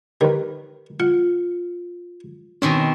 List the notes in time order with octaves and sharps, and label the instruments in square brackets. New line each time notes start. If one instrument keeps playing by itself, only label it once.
[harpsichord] D#3 [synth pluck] G4 A#4 B4
[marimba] F4 [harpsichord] F#5
[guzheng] B2 D#3 C4 [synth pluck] C#4